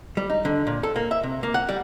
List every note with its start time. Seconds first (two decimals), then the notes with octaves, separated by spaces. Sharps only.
0.17 G3
0.30 D#4
0.45 D3
0.67 A#2
0.83 A4
0.96 A#3
1.11 E5
1.23 C3
1.43 A#3
1.54 F#5
1.69 G3